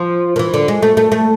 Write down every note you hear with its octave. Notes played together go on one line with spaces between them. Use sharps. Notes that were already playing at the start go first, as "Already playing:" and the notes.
Already playing: F3
D#3
E3
D3
G#3
A3
A3
A3